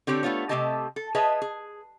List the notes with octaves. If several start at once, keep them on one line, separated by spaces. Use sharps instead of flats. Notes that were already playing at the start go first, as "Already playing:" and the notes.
D3 C4 G4 C#5
A3 B3 F4 C#5
C3 A3 C4 G4 D#5 A5
A4
G#4 B4 C#5 D#5 E5 A5
G#4